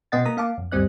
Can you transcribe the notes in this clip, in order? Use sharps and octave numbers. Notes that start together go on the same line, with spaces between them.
B2 B3 D#5 F#5 A6
A#3 A#5 D#6
A#3 F5 A5 D6
F2
D2 G2 G3 C4 D5 F#6